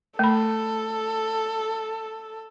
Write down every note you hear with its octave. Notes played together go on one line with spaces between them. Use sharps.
A3 A4 B5